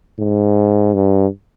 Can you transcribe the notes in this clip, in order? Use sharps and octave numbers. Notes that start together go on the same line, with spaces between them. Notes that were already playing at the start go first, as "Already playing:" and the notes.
G#2
G2